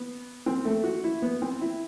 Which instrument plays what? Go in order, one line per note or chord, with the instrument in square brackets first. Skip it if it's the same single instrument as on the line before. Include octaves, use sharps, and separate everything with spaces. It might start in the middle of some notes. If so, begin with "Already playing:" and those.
Already playing: [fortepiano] B3
C4
A3
F#4
E4
B3
C4
E4